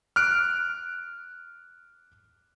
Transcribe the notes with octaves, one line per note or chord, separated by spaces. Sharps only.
F6 F#6 D7